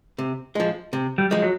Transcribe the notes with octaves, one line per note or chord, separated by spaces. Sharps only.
C3
F3 G#3
C3
G3
F3 G#3
F#3